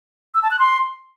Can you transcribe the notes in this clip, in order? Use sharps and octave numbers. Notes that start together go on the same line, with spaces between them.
E6
A5
F#6
C6